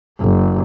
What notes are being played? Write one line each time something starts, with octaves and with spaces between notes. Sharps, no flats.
F#1